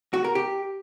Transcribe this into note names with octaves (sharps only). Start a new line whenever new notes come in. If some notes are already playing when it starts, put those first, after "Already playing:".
F#4
A#4
G4